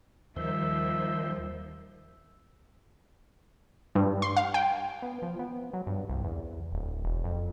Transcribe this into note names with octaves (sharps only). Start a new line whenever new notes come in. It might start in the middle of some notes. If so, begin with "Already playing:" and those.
D#2 D#3 F3 G3 C5 E5
G2
C6
F5
G5
B3
F3
B3
F#3
G2
C2
E2
D1
E1
F2